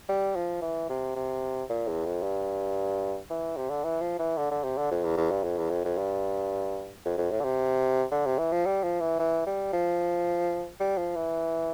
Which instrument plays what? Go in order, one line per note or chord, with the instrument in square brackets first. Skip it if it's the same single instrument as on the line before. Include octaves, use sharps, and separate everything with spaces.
[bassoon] G3
F3
E3
C3
C3
A#2
E2
F2
G2
E3
C3
D3
E3
F3
E3
D3
D3
C3
D3
F2
E2
E2
G2
F2
E2
F2
F2
G2
F2
F2
A2
D3
C3
D3
C3
E3
F3
G3
F3
E3
E3
G3
F3
G3
F3
E3